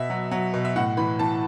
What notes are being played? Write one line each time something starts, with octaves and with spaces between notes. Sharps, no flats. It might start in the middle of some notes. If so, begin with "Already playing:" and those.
Already playing: B2 E5
F#3
F#3
B2
E5
A2 F#5
E3 B5
E3 A5